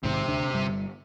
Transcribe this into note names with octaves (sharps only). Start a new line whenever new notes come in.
A#1 G#2 C3 D#3 C4
D#1 D2 D4
G1 G3